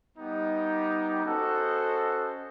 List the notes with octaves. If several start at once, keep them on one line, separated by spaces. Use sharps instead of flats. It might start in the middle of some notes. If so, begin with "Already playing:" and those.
G3 B3 D#4 G4
C#4 F#4 A4 C5 D#5